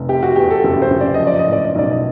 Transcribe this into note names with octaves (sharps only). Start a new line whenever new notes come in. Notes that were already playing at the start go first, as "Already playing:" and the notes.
Already playing: F1
C3 G4
F#4
E2 G4
A4
F#1 A4
C5
F#1
D5
D#5
F3
D5
D#5
A2
D5
D#5
B1 D5
D#5